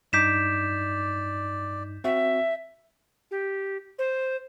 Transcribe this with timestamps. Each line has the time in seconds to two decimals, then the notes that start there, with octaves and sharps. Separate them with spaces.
0.13 G2 D#4 D5 D6 G6 B6 E7
2.04 C4 F#4 E5
3.31 G4
3.99 C5